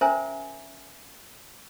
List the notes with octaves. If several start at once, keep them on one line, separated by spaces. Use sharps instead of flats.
C#4 A#4 C5 E5 G#5 A#5